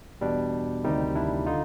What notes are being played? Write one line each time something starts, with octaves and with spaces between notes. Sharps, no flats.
E2 B2 G3 D4
D2 C3 D#3 G3 D#4
D4 E4
D3 D#4 F4